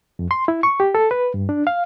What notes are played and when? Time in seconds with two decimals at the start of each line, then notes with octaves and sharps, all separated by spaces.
0.19 F2
0.31 C6
0.48 E4
0.63 C#6
0.80 G4
0.95 A4
1.11 B4
1.34 G2
1.49 D4
1.67 F5